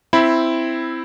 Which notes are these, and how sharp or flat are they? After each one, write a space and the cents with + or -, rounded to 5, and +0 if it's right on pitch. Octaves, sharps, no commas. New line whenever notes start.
C4 +0 E4 +5 B5 +0